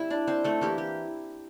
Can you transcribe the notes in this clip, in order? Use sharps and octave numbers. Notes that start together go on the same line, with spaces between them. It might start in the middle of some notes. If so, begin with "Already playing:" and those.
Already playing: G3 C4 E4 E5
D4 D5
C4 C5
A3 A4
E3 A#3 E4 G4
G4